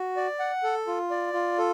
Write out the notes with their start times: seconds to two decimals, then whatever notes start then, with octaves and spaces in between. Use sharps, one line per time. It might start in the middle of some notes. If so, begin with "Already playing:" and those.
Already playing: F#4
0.17 D5
0.39 F#5
0.63 A4
0.87 F4
1.11 D5
1.33 F4
1.58 A4